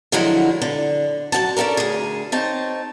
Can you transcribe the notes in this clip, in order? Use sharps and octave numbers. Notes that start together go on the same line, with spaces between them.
D3 F3 F#3 G#3 E4 F#5
D3
F#2 F3 F#5 A5
C#4 D4 F#4 A4 A#4
D2 G#4
C4 D#4 C#5 A5